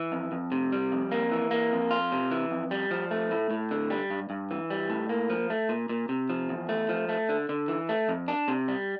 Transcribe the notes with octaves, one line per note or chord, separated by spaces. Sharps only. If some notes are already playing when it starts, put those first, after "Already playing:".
Already playing: E3
F2
F2
C3
G3
F2
A#3
E3
A#3
F2
F4
C3
E3
F2
G3
F3
A3
A2
A2
D3
G3
G2
G2
E3
G3
A2
A#3
F3
A3
A#2
A#2
C3
F3
E2
A3
F3
A3
D3
D3
E3
A3
F2
D4
C3
G3